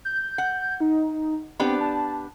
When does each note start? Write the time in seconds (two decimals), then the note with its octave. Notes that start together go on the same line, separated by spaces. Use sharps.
0.05 G6
0.38 F#5
0.80 D#4
1.60 B3 C4 D4 G4
1.81 A5